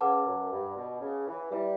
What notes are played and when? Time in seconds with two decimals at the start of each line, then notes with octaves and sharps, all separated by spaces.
0.01 C#3 B4 F#5 A5 D6
0.26 F#2
0.51 G2
0.76 B2
1.01 C#3
1.27 E3
1.51 G3 E4 B4 E5